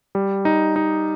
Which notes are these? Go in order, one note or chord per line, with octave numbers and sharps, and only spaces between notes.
G3
D#4
D#4